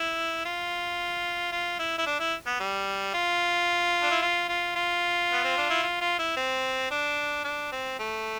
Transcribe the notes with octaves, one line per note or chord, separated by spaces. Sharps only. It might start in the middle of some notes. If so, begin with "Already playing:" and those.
Already playing: E4
F4
F4
E4
E4
D4
E4
B3
G3
F4
D4
E4
F4
F4
F4
B3
C4
D4
E4
F4
F4
E4
C4
D4
D4
C4
A3